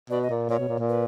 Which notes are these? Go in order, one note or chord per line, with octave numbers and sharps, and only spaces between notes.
B2 D5
D#5
A#2
A#2 C#5
B2
A#2
A#2
B4